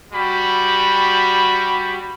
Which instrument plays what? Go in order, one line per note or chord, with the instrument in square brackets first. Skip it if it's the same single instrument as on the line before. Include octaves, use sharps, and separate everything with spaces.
[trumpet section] G3 F#4 G4 B5